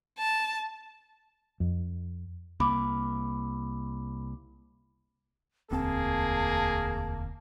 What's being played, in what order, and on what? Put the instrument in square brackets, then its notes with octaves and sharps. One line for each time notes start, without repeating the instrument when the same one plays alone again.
[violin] A5
[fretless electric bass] F2
[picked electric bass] C2 A#3 [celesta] B5 D6
[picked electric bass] E1 D2 C4 [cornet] A#3 [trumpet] G#4 [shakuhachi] A5